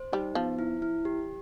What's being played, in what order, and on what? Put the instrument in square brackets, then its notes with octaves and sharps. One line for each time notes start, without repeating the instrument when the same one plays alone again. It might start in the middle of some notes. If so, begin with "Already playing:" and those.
Already playing: [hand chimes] C5
[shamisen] G3 [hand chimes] D#4
[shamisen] F3 [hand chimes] B3
[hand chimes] E4
E4
G4